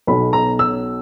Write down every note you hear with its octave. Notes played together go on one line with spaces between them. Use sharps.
B1 B2 B5
A#5
E6